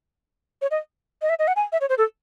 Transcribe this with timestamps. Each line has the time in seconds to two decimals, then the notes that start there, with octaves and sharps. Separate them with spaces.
0.62 C#5
0.71 D#5
1.22 D#5
1.29 E5
1.39 D#5
1.48 F#5
1.56 G#5
1.72 E5
1.81 C#5
1.89 C5
1.98 A4